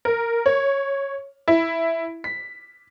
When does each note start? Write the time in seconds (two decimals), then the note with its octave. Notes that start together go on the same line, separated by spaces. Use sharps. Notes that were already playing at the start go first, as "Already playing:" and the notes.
0.05 A#4
0.46 C#5
1.48 E4
2.24 B6